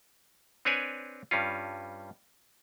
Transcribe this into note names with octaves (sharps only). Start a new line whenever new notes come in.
C4 D4 B4 C#5 D5 G#5
G2 G3 C#4 F4